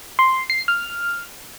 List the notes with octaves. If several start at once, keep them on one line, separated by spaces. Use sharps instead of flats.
C6
C7
F6